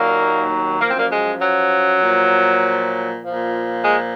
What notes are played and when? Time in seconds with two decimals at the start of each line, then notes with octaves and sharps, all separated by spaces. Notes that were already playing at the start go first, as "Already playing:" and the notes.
Already playing: D#2 A#2 D#3 F#3 A#3
0.81 F3 A#3
0.85 F#2 C4
0.97 A#2 A#3
1.11 G#3
1.41 F#3
2.02 A#2 F3
3.23 A#2 F3
3.83 G#3